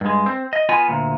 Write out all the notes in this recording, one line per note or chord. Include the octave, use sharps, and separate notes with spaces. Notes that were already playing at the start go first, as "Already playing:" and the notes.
G2 G#3
C4
D#5
B3 F4 G#5
D2 A#2